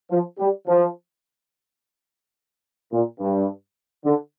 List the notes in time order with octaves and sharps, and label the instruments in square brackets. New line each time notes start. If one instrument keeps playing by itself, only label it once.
[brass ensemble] F3
G3
F3
A#2
G2
D3